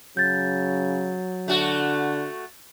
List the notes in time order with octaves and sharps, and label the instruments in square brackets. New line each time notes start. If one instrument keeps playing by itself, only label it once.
[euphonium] C#3 [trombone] F#3 [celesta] G6 A6
[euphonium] D3 [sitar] A3 F#4